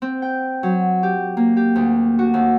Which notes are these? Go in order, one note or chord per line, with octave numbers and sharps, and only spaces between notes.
C4
G5
F#3
G4
A#3
G4
D2
F#4
D#2